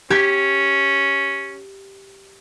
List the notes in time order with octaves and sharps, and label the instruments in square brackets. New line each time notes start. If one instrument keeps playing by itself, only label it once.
[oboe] C#4 [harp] G4 G#6